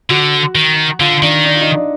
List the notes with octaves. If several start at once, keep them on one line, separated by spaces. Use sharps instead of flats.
D3 F#4
D#3
D3 F4
D#3 D4
D4
F4
D#4
D4